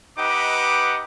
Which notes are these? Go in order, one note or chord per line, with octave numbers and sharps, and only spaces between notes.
D#4 G4 B4 D#5 F#5 D6